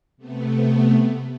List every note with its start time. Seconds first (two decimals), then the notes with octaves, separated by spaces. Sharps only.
0.17 C3 A3 B3